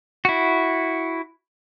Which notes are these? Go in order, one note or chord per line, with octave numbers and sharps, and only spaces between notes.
E4 F#4